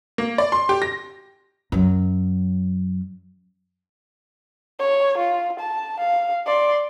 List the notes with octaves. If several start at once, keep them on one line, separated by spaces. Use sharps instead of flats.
A#3
D5
C6
G4
A#6
F#2 F#3
C#5
F4
A5
F5
D5 C6